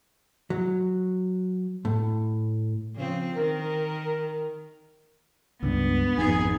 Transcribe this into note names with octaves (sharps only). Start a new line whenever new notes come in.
F#3
A2
C#3 F3 C4
D#3 A#4
C#2 G2 B3
G#1 F2 D#4 G#4 G#5